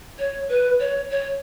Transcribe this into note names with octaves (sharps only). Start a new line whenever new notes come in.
C#5
B4
C#5
C#5